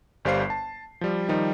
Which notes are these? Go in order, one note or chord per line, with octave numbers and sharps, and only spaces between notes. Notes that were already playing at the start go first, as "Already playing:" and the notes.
G1 G3 C5 F5 C7
A5
F3 G3
D#3 F3 G3 D#4